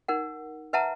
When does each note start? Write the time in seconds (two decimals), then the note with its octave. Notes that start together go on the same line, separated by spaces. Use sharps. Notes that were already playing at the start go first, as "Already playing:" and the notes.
0.08 D#4 A#4 F#5
0.73 B4 E5 F#5 A5 A#5